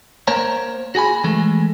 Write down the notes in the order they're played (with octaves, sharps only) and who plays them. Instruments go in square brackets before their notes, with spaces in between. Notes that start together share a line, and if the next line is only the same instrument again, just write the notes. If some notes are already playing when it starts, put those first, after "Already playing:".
[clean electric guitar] A#3 A#4 C5 C#5 A#5
F#4 G#4 G#5 B5
E3 G#3 A3